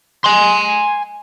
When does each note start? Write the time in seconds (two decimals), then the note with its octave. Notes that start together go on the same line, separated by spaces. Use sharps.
0.24 G#5 C6